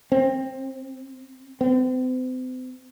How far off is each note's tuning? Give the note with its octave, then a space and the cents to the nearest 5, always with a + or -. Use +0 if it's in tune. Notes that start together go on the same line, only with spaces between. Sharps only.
C4 +15
C4 -40